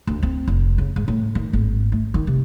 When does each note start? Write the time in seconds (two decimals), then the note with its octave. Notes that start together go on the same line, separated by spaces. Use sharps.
0.07 D2
0.23 C4
0.48 F1
0.78 C#3
0.96 G#2
1.08 A2
1.35 D#3
1.53 G#1
1.92 A3
2.14 D#3
2.27 C3